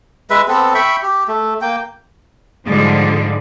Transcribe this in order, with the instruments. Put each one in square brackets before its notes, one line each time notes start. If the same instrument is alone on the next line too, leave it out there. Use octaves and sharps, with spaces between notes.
[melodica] G#3 B4 E5
B3 C4 A4
E5 G5 B5 C#6
G4
A3
A#3 G5
[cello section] G#2 D3 F3 G3 G#3